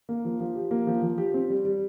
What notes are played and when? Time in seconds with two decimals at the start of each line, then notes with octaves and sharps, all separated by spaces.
0.09 A#3
0.25 F3
0.40 F3
0.55 G4
0.71 A#3
0.87 F3
1.02 F3
1.18 G4
1.34 C4
1.50 G3
1.65 G3